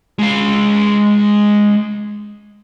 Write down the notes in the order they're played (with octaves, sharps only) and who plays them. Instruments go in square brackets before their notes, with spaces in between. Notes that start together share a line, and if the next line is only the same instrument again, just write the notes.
[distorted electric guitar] G#3 F5